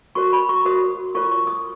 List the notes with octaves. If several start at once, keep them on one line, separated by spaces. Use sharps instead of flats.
F#4 A#4 C#5 C#6
B5
C#6
F#4 A#4 C#5 D#6
F4 A#4 C#5 C#6
C#6
D#6